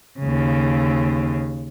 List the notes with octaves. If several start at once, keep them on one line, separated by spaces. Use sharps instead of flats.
D#2 C#3